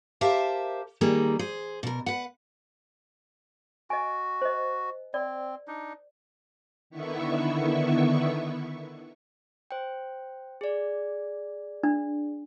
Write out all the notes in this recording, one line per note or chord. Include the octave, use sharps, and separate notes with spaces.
G4 A#4 C5 E5 F5 A5
D#3 G3 A#3 G#4
G#4 C5
B2 A#4
B4 F#5
F#4 D#5 G#5
C5 D#5
C4 D5
D4 D#4
D3 D#3 B3 E4 E5 C#6
C5 G5
G#4 D5
D4